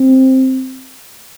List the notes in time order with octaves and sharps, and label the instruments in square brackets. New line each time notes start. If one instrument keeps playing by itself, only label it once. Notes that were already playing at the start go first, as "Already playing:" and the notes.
Already playing: [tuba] C4